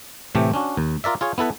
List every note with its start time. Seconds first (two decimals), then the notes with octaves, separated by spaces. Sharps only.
0.35 A2 C3 E3 A3 G4
0.54 C#4 D4 F#4
0.77 D#2
1.04 F4 A#4 D5 E5
1.21 F4 G#4 C#5
1.38 B3 E4 A4 B4